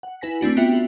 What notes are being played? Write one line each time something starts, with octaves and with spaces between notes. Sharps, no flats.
F#5
E4 B4 G#5 A#6 B6
A3 C4 D4 F#4
B3 D4 F4 F#4 E5 G5
F#4